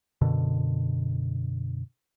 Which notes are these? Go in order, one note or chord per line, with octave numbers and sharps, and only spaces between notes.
F#2 B2 D3